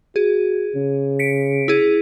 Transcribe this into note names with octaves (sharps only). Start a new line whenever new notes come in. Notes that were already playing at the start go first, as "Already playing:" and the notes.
F#4 G#4
C#3
B6 C#7 D7
E4 G#4